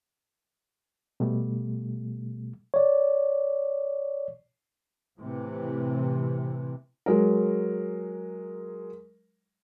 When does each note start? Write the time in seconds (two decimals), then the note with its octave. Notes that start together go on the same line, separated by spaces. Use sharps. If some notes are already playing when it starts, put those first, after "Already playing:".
1.20 B2 G3 A3
2.74 C#5 D5
5.18 A2 C3 E3
7.06 F#3 G#3 A#4